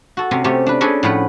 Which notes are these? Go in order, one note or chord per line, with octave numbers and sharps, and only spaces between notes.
F#4 A4
C3 C4 C#4
C3 A3 C#4 G4
D4 B4
C#4 D4 G#4 A4 B4
A2 F3 B4 F#5